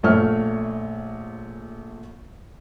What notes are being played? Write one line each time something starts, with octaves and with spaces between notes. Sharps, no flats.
A#1 A3 C#5 F6